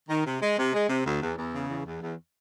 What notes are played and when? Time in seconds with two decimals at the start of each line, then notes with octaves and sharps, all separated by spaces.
0.09 D#3
0.26 C3
0.42 G#3
0.58 C3
0.74 G#3
0.89 C3
1.06 D2
1.22 E2
1.37 E2
1.54 C#3
1.69 E2
1.86 E2
2.01 E2